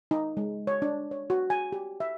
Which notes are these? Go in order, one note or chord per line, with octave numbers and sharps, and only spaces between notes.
D#4
G#3
C#5
D4
C#5
F#4
G#5
G4
E5